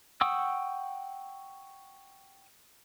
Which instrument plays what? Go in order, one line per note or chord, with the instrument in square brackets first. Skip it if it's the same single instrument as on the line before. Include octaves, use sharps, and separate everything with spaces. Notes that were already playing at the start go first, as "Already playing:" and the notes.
[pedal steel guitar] F#5 G5 C#6 D#6 E6